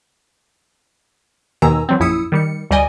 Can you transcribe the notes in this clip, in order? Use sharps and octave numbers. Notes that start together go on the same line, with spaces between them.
D#2 B2 D#3 G#5 A#5 E6
E3 F#3 C4
A#1 F#2 E4 D#6 E6 C#7
D#3 G3 C#7
D2 G3 D5 D#5 G#5